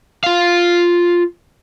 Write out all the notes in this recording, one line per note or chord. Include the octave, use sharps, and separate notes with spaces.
F4 F5